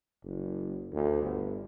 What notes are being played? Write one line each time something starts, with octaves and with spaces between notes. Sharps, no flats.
F#1
D2
G1